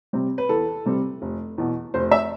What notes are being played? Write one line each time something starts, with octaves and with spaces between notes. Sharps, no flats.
C3 G3 C4
B4
E2 A4
C3 G3 C4
F1
E2 B2
F1 C5
E5